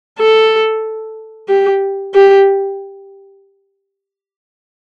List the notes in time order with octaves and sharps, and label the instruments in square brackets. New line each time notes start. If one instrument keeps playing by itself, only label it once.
[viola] A4
G4
G4